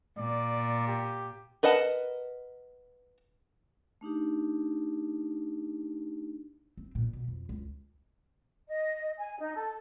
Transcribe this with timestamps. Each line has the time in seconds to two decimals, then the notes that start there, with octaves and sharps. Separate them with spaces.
0.19 A#2 D5
0.88 G4
1.63 A#4 B4 D#5 F#5 A5
4.01 A3 D4 D#4 G4
6.77 C4
6.95 A#2
7.13 B2
7.28 F2
7.49 C#2
8.68 D#5
9.18 G#5
9.39 D#4
9.55 A4